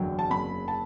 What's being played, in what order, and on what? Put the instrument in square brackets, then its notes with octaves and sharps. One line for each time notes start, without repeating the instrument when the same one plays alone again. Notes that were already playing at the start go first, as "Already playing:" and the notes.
Already playing: [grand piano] F#1 E2 D3 F#3 G5
A5
F#1 B5
A5